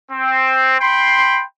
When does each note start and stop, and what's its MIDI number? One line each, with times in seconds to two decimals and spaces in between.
0.12 0.79 60
0.80 1.43 79
0.80 1.43 83
0.80 1.43 84